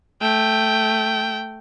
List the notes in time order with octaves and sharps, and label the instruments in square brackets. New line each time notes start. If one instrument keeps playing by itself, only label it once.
[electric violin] A3 G5